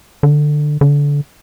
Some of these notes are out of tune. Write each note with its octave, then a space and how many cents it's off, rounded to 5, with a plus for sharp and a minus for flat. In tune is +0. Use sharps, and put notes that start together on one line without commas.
D3 +15
D3 -25